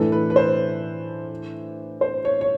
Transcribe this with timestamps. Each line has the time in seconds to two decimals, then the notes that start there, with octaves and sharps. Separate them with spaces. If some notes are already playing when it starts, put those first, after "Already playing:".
Already playing: A2 E3 A3 D4 A4
0.12 B4
0.30 B4
0.36 C5
2.01 C5
2.25 C#5
2.41 C#5